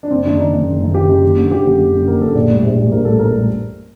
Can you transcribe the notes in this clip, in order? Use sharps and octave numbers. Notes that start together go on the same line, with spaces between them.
D4
F#1 C4
F#2 D#3 D4
F#1 D#4
F#2 D#3
F#1
F#2 D#3
F#1 G4
F#2 D#3
F#1
F#2 D3
F#1 G4
F#2 D3
F#1
F#2 D3
F#1 A#4
F#2 D3 A4
A#1 D5
A2 G3
A#1
A2 G3
A#1 A#4
A2 G3 A4
A#1 A#4
A2 G3